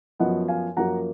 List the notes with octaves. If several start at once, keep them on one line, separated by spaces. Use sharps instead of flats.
F#2 F3 B3 D#5 F#5
F5 G#5
F#2 F3 A#3 F#5 A#5